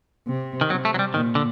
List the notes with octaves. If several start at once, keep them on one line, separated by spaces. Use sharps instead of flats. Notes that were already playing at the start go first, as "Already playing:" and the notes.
C3
D#3
C3 F#3
A3
F#3
G3
A#2 D#3
D3